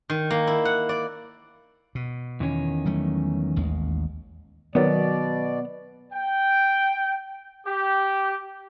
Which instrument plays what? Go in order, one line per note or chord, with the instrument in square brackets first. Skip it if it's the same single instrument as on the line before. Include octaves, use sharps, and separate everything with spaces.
[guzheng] D#3
A#3
E4
F#5
D5
[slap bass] B2
[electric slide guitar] E2 D#3 C#4
[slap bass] F#3 G3 A3
A1 D#2 G#3
[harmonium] B2 D5 [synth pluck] D#3 F#3 [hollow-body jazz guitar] B3
[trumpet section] G5
G4